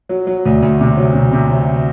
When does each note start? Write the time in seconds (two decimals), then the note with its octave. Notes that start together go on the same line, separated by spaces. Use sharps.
0.09 F#3
0.27 F#3
0.46 D2
0.63 D2
0.81 C3
0.97 F#3
1.15 C3
1.33 C3
1.50 F#3